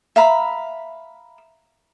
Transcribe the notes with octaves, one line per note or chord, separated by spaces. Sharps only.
E5 F5 A#5 B5